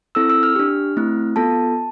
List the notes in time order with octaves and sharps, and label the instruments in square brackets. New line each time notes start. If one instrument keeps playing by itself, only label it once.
[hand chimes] C4 E4 A4 E6
E6
F6
D4 G4
A3 C4 E4
B3 F4 A4 A5